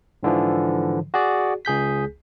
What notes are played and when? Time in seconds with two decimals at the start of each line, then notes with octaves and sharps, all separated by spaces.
0.23 G#2 D3 E3 F3
1.14 F#4 G#4 D5
1.65 C#2 G#4 G6 B6